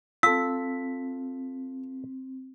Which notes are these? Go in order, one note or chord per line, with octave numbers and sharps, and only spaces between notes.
C4 F4 A4 E6 B6